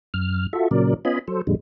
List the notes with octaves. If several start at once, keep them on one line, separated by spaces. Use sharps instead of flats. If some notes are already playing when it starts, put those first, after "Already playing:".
F#2 F6
F4 F#4 A4 E5
A#2 C#3 F#3 A#4 D5
B3 C#4 F4 D#5 G#5 B5
F#3 A4 C5
F2 A#2 D3 G3 G#3